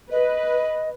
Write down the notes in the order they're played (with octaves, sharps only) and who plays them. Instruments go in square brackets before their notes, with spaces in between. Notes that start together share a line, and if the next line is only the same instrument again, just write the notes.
[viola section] B4 [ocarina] D#5